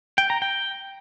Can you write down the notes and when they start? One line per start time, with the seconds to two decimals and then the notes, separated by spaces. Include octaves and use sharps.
0.18 G5
0.30 A#5
0.42 G5